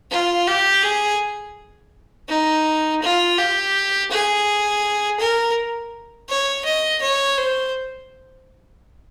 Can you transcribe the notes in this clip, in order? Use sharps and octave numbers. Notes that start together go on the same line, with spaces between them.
F4
G4
G#4
D#4
F4
G4
G#4
A#4
C#5
D#5
C#5
C5